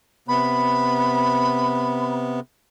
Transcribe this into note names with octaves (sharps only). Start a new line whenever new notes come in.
C3 B3 B5